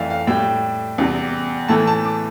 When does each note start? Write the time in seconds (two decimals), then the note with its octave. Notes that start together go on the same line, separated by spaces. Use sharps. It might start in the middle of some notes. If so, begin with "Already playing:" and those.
Already playing: F2 E3 A3 D5 E5 F5
0.10 F5
0.27 A2 G3 G5
0.98 E2 C3 G3
1.68 A2 E3 A3 A5
1.87 A5
2.05 D6